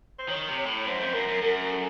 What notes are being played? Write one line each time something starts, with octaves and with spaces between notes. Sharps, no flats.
C5
D#3 C#5
C3
C#5
A2
F#2 C5
F2
F#2 A#4
F#2
F#2 A#4
A4